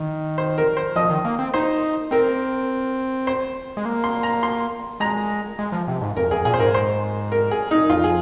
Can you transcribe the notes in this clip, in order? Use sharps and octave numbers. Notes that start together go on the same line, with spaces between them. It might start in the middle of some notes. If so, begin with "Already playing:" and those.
Already playing: D#3
C5
A#4
C5
F3 D#5
D#3
A#3
C4
D#4 C5
C4 A#4
C5
G#3
A#3
C6
A#5
C6
G#3 A#5
G#3
F3
C3
G#2
F2 A#4
F2 G#4
A#2 G#4
C5
G#2 A#4
C5
A#4
G#4
D#4
F2 F4
G#4